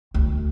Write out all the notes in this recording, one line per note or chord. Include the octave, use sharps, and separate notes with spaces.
D2